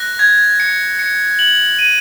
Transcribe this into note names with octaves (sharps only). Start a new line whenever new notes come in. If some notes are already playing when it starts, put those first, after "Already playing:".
Already playing: F#6 A#6
G#6
C#7
C#7
F#7
D#7